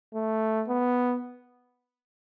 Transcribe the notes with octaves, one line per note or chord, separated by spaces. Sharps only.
A3
B3